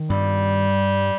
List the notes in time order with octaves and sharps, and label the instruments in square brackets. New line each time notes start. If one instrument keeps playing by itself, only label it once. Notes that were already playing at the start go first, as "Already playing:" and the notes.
Already playing: [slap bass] D#3
[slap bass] G2 [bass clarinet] G3